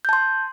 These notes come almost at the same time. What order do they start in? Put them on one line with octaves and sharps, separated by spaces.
G6 A5 C6